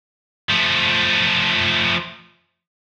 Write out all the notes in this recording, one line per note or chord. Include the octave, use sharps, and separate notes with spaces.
F3 A3